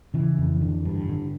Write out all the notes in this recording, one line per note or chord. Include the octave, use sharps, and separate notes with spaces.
C#3 E3
F2
D3
G2
D3